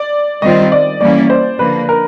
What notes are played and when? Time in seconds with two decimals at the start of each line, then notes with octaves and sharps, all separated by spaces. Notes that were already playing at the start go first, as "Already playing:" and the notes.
Already playing: D5
0.42 D#3 G3 C4 F4 D#5
0.72 D5
1.01 E3 G3 A#3 C#4 E4 D5
1.30 C5
1.59 D3 F3 A#3 B4
1.89 A#4